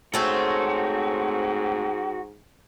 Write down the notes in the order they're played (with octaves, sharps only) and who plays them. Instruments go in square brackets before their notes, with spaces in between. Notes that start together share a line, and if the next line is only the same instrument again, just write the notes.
[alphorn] G#2 [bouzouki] A3 C4 C#4 [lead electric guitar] F#4